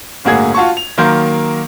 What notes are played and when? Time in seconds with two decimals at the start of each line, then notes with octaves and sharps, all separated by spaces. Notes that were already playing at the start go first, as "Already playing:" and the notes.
0.25 G1 A2 A#3 F#4 G#4 G#6
0.54 F4 F#4 A5 C#6
0.77 F7
0.98 D#3 F#3 A#3 A#4 C6 G6